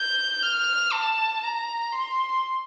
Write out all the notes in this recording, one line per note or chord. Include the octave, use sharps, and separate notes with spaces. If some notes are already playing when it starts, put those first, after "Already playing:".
Already playing: G6
F6
A5
A#5
C6